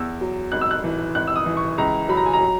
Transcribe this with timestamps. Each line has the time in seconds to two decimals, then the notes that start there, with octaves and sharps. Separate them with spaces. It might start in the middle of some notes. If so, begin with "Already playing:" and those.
Already playing: E2 E6
0.21 F#3
0.52 G#1 F#6
0.61 E6
0.71 F#6
0.84 E3
1.15 G#1 F#6
1.27 E6
1.36 D#6
1.46 E3
1.57 C#6
1.78 C#2 A#5
2.09 F#3 B5
2.17 A#5
2.26 G#5
2.33 A#5
2.41 F#3